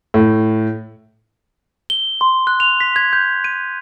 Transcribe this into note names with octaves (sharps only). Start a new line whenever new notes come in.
A2
G7
C6
F#6
F7
B6
G#6
G6
D#7